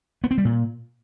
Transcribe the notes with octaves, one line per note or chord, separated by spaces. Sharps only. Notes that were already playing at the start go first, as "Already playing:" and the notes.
B3
C4
G3
A#2